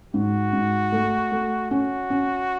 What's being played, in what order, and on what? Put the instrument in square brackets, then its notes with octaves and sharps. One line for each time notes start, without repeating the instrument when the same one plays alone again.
[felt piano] G#2 [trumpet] F#4
[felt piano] G#2
A3
A3
[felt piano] C#4 [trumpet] F#4
[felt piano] C#4